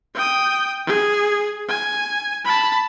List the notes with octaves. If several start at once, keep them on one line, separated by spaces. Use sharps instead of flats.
G5 D#6
G#4
G#5
A5 B5